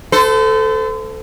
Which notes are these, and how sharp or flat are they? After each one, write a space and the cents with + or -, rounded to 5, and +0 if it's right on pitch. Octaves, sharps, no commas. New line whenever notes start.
A4 +0 C5 -40